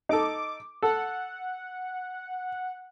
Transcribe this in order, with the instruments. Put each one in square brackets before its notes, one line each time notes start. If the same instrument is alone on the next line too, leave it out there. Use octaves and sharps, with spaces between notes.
[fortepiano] D#4 A4 [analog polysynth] D6
[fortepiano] A4 [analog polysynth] F#5